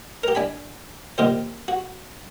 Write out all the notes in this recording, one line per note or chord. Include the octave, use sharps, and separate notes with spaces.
G4 A#4
D4 G#5 B5
A#2 D#3 G4 C5
F#4